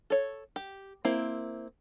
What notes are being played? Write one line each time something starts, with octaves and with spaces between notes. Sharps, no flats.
A4 C#5
G4
A#3 C4 E4